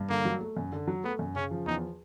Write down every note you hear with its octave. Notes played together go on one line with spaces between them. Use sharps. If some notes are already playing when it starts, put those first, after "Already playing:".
Already playing: G2
D3 A#3
F#3
A3
F#2
D3
F#3
A3 B3
F#2
C#3 C#4
F3
E2 D#4